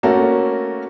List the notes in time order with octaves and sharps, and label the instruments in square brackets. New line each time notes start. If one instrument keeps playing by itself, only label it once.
[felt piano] A3 A#3 C#4 F#4 A4 A#4